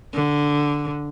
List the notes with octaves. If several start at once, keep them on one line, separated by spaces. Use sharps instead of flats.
D3